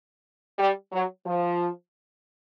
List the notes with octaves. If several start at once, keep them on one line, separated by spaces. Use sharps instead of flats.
G3
F#3
F3